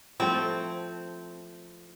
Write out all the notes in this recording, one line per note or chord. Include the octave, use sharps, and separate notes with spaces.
F3 A3 C4 E4